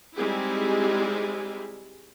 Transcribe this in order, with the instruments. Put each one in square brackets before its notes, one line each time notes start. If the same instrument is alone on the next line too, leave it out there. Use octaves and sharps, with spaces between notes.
[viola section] G3 G#3 C4 D#4 E4 G#4